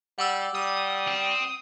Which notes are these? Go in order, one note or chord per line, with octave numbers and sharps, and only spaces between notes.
G3 F#5 D6 E6
G3 D#6
C4